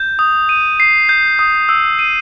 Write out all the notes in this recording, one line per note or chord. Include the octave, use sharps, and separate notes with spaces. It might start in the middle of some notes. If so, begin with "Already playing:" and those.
Already playing: G6
D#6
D#7
C7
G6
D#6
E6
D#7